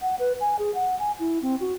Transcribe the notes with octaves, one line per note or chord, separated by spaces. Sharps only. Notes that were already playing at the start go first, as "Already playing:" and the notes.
F#5
B4
G#5
G#4
F#5
G#5
E4
C4
F#4